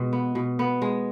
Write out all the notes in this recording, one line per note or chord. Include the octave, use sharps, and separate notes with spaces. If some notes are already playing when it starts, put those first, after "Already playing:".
Already playing: B2 G#3
B3
B2
B3
G#3